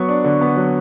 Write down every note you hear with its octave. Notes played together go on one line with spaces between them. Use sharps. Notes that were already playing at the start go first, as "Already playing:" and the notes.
Already playing: F#3 B3 C#6
D4
D3
B3
F#3